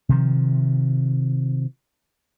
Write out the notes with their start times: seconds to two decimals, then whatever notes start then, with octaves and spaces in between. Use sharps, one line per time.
0.09 C3 D#3 F3